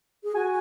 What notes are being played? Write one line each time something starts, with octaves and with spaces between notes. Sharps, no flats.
G#4
F#4 G#5